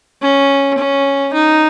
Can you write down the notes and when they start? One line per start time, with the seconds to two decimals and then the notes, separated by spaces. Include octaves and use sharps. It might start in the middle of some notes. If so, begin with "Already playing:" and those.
0.22 C#4
0.78 C#4
1.33 D#4